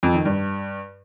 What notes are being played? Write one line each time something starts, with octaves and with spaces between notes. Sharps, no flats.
F2
D#3
G2